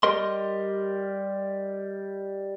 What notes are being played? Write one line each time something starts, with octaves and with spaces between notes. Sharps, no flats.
G3 G4 A#4 D#5 C6